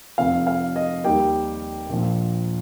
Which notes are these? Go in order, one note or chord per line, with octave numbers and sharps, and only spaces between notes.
F1 F2 F3 C4 F5
F5
D#5
D#2 D#3 G3 G4 G5
A#1 A#2 F3